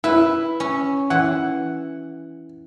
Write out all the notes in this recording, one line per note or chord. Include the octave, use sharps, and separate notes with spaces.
E4 B4
C#4
E3 F#5